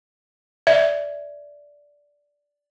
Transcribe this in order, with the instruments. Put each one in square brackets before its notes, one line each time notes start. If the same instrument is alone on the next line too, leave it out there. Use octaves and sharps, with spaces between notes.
[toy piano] D5 [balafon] E5